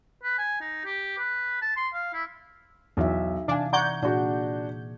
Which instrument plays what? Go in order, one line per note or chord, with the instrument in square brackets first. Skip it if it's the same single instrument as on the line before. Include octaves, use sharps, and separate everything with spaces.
[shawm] B4
G#5
D#4
G4
B4
A5
C6
F5
E4
[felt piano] B1 [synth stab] E2 [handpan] D#4 E5
[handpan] C3 E3 [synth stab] D4 [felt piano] F5 G#5
[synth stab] D5 F#5 G6 [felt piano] A#5 C#6 G#6
[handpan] A#2 G#4 [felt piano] D4 F#4